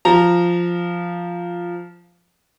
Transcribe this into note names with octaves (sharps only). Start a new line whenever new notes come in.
F3 A#5